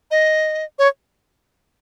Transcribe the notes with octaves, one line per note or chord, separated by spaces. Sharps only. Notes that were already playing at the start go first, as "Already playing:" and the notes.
D#5
C#5